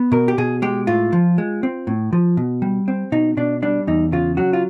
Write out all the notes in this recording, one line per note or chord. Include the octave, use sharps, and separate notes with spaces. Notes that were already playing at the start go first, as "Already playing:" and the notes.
Already playing: B3
B2 A#4
G4
B2 G#4
G#3 G4
A2 F4
F3
G#3
C4
A2
F3
B2
G3
C4
B2 D#4
B2 D4
G3 D4
E2 D#4
C#3 F4
F#3 F#4
F4